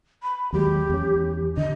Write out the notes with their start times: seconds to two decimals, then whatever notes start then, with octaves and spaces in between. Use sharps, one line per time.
0.23 B5
0.53 D#2 F#3 G#3 G4
0.90 E2 C#4
1.57 D3 D#5